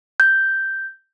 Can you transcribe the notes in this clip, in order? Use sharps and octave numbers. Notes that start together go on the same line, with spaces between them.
G6